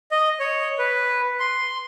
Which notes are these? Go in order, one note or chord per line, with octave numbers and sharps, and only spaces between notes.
D#5
C#5
B4
C6